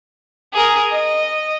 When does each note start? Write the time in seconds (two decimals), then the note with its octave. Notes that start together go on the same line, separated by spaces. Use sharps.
0.53 G#4 A#4
0.91 D#5